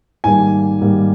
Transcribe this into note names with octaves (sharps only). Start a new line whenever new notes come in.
G#2 D#3 G3 A#3 G#5
G#2 D#3 G3 A#3